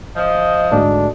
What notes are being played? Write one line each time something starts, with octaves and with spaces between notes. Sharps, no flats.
F3 D#5
D2 G#2 D4